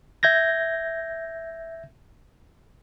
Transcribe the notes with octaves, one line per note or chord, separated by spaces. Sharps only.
E5 G6 G#6 A#6